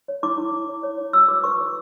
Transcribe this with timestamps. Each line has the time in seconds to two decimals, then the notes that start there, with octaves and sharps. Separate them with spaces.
0.08 C#5
0.23 E4 D6
0.38 E4
0.53 E4
0.68 C#5
0.83 C#5
0.99 E4
1.13 F#4 E6
1.28 B4 D6
1.44 B4 C#6
1.59 B4